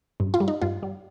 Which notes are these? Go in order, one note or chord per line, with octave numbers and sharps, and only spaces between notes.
G2
F4
G3
D#4
G2 F4
G3